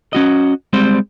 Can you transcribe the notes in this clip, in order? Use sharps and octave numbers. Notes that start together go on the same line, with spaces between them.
C#4 F#4 D#5
G3 G#3 C4 C5